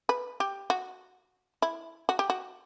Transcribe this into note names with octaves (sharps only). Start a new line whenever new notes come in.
B4
G4
F#4
E4
F#4
G4
F#4